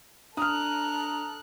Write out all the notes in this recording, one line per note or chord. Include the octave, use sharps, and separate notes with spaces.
D4 A4 A#5 D#6 F6 F#6